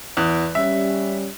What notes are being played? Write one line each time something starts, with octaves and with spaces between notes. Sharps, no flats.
E2 F#6
G3 C#4 E5